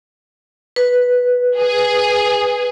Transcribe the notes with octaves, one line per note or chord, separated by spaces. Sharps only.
B4
G#4